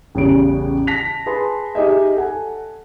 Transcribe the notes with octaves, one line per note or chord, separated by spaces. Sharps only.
A1 E2 C#3 G3 D7
A5 A#6 B6 F7
G#4 B4 A5 C6
D#4 G4 G#4 D#5 E5
A4 F#5 G#5